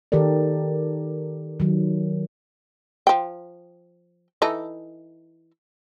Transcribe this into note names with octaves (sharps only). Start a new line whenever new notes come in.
D#3 G4 A4 A#4 D5
D#3 F#3
F3 G5
E3 D#4 A4